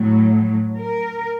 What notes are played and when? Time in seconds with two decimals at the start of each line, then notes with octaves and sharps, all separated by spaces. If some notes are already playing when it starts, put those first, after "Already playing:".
Already playing: A2 F#3 A3
0.79 A#4